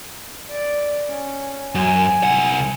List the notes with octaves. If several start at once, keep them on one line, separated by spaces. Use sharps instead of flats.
D5
C#4
F#2 G#5
C2 F#5